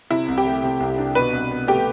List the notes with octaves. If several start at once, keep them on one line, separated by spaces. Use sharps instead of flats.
C3 E4
C2
G4
A3
C3
C2
D4
B2 B4
C2
B3
A3 G4